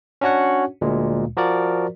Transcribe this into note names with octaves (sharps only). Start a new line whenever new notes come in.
C#4 D4 F#4 C#5 F#5
D2 A#2 G#3
F3 F#4 A#4 D5